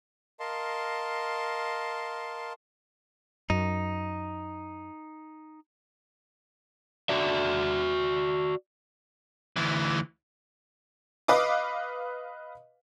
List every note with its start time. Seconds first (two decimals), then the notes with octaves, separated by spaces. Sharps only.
0.40 A#4 D#5 F5 A5 C6
3.50 F#2 D#4
7.09 F#4 D5 E5
9.56 D2 E3
11.28 B4 D#5 F5 D6